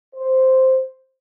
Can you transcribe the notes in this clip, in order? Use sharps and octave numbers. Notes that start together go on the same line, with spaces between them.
C5